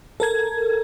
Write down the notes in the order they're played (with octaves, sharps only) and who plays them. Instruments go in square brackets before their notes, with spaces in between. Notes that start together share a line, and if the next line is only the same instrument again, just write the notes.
[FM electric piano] A4 A#4 G#6